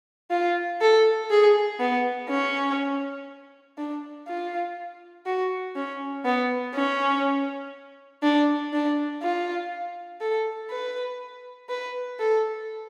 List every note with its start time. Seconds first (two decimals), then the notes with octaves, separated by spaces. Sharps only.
0.31 F4
0.81 A4
1.30 G#4
1.80 B3
2.29 C#4
3.78 D4
4.28 F4
5.26 F#4
5.76 C#4
6.25 B3
6.74 C#4
8.23 D4
8.73 D4
9.22 F4
10.21 A4
10.70 B4
11.69 B4
12.19 A4